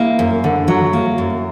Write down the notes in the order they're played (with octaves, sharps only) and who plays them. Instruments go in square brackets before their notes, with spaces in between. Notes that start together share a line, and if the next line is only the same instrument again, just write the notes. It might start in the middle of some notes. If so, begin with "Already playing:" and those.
Already playing: [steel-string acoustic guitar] A#3 [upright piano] E4
[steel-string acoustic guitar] F#2
D3
F#3
A#3
F#2